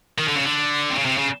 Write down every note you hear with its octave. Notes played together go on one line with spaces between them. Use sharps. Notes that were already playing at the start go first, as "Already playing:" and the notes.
D#3
D3
C#3
D3
C3
C#3
C3
C#3